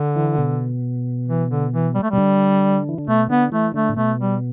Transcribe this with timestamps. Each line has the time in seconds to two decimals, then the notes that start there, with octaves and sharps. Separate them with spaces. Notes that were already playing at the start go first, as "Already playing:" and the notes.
Already playing: D3
0.16 E3
0.38 B2
1.28 E3
1.50 D3
1.73 E3
1.95 G3
2.03 A3
2.11 B2 G3
2.18 D3
2.89 E3
2.98 D3
3.07 B2 A3
3.29 D3 B3
3.52 E3 A3
3.74 D3 A3
3.89 A2
3.97 B2 A3
4.20 G3